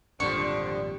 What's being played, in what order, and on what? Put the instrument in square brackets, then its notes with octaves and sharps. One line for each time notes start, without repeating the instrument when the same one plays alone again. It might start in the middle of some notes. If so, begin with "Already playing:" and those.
[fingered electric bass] G#1 F2 A#2 [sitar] D3 F3 [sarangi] G3 [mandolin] C#6